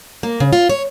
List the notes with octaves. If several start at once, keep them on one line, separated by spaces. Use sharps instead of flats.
A#3
C#3
F4
C#5